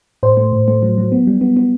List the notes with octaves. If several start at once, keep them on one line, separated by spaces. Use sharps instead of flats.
A2 C5
A3
A2
A3
F#3
F#3
B3
G3
B3
B3